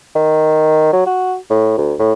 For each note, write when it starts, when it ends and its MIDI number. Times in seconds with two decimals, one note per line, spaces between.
0.15 0.92 51
0.92 1.02 54
1.06 1.36 66
1.50 1.77 45
1.78 1.94 38
1.99 2.13 45